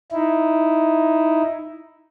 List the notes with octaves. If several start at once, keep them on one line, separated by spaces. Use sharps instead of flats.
D#4 E4